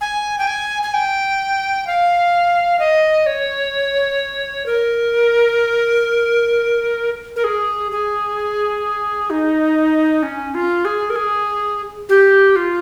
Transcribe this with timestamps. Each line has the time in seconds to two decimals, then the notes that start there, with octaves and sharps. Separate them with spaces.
0.01 G#5
0.38 G5
0.47 G#5
0.83 G#5
0.94 G5
1.87 F5
2.79 D#5
3.26 C#5
4.66 A#4
7.36 A#4
7.44 G#4
7.91 G#4
9.30 D#4
10.23 C#4
10.55 F4
10.85 G#4
11.10 A#4
11.16 G#4
12.09 G4
12.56 F4